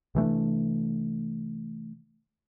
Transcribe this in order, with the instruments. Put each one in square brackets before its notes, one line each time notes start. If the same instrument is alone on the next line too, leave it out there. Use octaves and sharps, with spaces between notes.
[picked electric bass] C3 E3 A3 D4